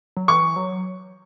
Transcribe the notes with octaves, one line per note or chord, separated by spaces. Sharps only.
F#3
E3 C#6
F#3